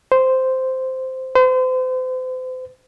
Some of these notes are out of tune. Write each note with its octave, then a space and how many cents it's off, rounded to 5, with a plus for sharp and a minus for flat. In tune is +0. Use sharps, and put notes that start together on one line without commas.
C5 -5
C5 -35